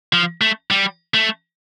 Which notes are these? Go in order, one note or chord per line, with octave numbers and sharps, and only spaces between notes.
F3
A3
G3
A3